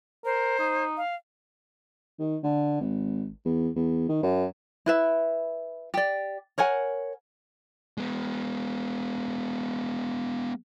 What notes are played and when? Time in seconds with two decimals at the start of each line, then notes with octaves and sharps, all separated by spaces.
0.25 A#4 C5
0.59 D#4
0.97 F5
2.19 D#3
2.44 D3
2.81 G#1
3.45 E2
3.76 E2
4.09 D#3
4.23 F#2
4.86 E4 B4 E5
5.94 G4 D5
6.58 A#4 C#5 F#5 G#5
7.98 G#3 B3